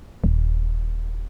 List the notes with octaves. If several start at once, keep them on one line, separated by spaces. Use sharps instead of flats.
D#1